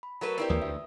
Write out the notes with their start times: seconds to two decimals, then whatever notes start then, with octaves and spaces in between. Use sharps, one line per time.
0.03 B5
0.21 F#3 A3 A#4 B4 A#5
0.38 C4 E4 G4 B4 D5
0.50 D#2 E3 A#3 D#6
0.62 D2 E5